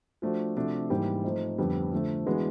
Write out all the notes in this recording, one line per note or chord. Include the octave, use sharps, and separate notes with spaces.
F3 A3 D4 F#4
C3 F3 A3 D4 F#4
G#2 E3 G3 A#3
F3 A3 C4 D#4
F2 D3 G3 B3
D3 F3 A3
E3 G#3 B3 D4 F#4